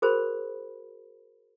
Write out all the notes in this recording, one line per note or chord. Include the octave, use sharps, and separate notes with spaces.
F#4 G#4 A#4 C5 B5